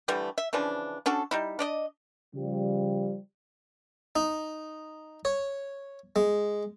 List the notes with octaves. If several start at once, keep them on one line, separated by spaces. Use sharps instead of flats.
D3 E3 G3 A3
E5
C#3 E3 F3 D4
C#4 D4 F#4 A4
G3 D#4 E4
D4 D5 D#5
C#3 F3 G3
D#4
C#5
G#3